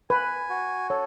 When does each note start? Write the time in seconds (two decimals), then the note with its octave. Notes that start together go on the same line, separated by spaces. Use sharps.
0.10 B4 G#5
0.50 F#4
0.90 A4 C#5